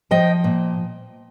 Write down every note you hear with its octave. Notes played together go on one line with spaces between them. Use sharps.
F3 D#5 G5
A#2